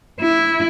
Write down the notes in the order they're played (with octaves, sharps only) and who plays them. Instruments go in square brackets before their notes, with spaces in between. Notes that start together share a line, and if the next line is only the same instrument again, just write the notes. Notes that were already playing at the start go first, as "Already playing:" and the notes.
[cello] E4